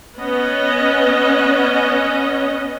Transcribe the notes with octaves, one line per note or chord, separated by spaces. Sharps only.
B3 C#4 D#5